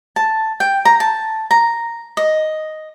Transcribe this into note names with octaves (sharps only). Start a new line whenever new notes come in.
A5
G5
A#5
A5
A#5
D#5